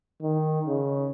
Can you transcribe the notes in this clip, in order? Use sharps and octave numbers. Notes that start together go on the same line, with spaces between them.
D#3
C#3